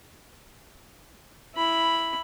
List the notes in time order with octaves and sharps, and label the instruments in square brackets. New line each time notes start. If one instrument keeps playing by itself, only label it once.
[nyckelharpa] E4 B5